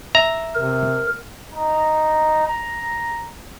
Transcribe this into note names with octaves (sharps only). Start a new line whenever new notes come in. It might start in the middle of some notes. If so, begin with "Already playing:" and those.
E5 A#5
C3 A#4
D#4 A#5
A#5